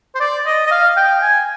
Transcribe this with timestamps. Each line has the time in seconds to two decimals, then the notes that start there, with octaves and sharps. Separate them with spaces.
0.15 C5
0.20 D5
0.46 D#5
0.67 D#5
0.71 F5
0.97 G5
1.22 G#5